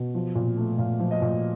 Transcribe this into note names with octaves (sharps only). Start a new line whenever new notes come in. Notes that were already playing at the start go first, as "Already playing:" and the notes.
Already playing: B2
F3
A#2
A3
A#2 F5
F3
D#5
A#2